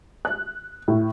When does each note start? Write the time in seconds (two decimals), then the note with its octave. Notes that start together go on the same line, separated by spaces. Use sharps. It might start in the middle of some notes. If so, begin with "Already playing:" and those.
0.25 F#6
0.88 A2